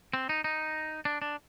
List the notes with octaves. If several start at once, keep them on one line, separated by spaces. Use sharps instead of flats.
C4
D#4
D#4
D4
D4